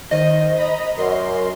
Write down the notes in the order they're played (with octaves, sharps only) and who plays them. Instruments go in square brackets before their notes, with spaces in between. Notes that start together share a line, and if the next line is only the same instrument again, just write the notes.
[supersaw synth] D#3 [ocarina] C5 [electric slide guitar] D#5
[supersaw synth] A#5 B5 D#6
[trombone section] F#2 [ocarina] A#4 [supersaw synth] C6